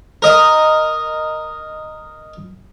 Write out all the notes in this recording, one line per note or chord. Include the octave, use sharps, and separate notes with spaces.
A#4 D#5